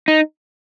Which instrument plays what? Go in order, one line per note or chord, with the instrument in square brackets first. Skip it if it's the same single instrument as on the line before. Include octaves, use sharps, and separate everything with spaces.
[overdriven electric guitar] D#4